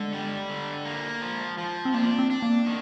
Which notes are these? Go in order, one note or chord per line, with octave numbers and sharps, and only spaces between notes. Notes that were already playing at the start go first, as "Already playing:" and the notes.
Already playing: D3 G#3
G3
D3
A#3
F3
F3
C4
A#3 D4
C4
D4
A#3
D#3